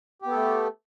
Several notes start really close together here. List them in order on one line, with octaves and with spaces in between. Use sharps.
G4 B3 A4 A3